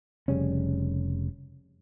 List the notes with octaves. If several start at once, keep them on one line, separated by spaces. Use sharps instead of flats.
F1 C#3 G3 C#4